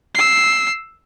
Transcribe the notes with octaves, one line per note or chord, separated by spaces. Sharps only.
E6 C7